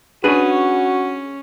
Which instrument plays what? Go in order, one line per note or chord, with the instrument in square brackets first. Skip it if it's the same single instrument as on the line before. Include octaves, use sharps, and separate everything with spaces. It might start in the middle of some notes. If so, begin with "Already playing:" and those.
[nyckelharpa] C#4 [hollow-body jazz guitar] D4 G#4 B4 [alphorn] F#4